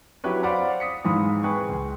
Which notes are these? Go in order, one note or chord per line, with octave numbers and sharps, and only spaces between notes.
F#3 E4 G4 B4 C#5
C5 D5 F5 F#5 B5 D6
D#6 B6 C#7
G#2 E3 G#3 F5 B5 D#6
G#4 B4 G5 C#6
C#2